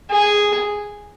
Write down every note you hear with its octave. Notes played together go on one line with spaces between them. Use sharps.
G#4